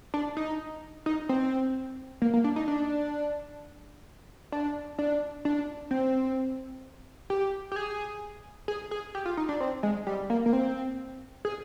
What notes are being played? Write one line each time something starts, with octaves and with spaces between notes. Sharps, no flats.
D4
D#4
D#4
C4
A#3
A#3
D4
D#4
D4
D4
D4
D4
C4
G4
G4
G#4
G#4
G#4
G4
F4
D#4
D4
C4
G#3
G3
A#3
A#3
C4
G#4